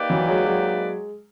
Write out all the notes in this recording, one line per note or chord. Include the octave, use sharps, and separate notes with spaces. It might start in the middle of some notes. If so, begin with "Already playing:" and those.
Already playing: A#3 D#4 G4 B4 D5
E3 F#3
F#3 G#3
F#3 G#3